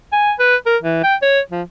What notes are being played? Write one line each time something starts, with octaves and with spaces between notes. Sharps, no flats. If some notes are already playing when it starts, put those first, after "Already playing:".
G#5
B4
A#4
E3
G5
C#5
F3